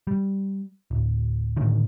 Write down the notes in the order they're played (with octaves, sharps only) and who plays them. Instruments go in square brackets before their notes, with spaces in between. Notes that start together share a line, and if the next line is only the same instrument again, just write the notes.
[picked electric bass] G3
D1
A2 D3 D#3